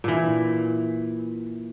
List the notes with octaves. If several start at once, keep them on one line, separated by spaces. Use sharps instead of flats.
A#2 E3